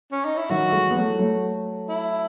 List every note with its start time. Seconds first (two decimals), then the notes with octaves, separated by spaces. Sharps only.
0.12 C#4
0.25 D#4
0.37 E4
0.50 D#3 F#3 F#4
0.72 E3 G#3
0.91 B3
0.96 F#3 A3
1.19 F#3 A3
1.89 E4